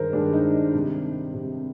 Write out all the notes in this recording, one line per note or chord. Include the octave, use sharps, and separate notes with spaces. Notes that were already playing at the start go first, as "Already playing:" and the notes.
Already playing: G2 D#3 G#3 A#4 C5
G2 D#3 G#3 D4
D#4
C3 G3
C3 G3